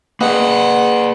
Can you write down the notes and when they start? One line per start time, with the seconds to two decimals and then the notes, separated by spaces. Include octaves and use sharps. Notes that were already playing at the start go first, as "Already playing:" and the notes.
0.20 A#3 G#4 B4 D#5 F#5 G5